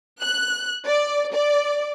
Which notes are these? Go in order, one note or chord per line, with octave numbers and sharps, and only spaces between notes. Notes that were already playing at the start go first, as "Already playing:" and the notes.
F#6
D5
D5